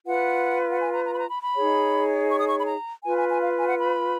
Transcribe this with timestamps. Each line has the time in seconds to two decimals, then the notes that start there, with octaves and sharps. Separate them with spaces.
0.06 F4 B4 F#5
0.70 F#5
0.80 G#5
0.93 A#5
1.05 A#5
1.13 B5
1.18 A#5
1.31 B5
1.42 B5
1.55 D#4 G#4 C#5
2.29 C#6
2.39 D#6
2.48 C#6
2.58 B5
2.67 A#5
3.04 F4 B4 G#5
3.16 G#5
3.30 G#5
3.42 F5
3.59 G#5
3.66 F#5
3.79 B5